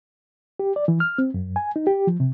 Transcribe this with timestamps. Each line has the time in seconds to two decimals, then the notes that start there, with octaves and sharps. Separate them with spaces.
0.60 G4
0.76 D5
0.88 E3
1.00 F6
1.18 C4
1.34 F#2
1.56 G#5
1.76 D#4
1.87 G4
2.07 F3
2.20 C3